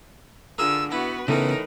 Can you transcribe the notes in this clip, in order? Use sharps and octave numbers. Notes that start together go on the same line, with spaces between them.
D3 F4 G#4 A#4 E6
B3 E4 F#4 B4
A2 C#3 E3 A3 B3 D#4 A#4